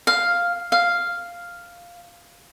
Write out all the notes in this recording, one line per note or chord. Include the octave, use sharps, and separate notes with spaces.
F5
F5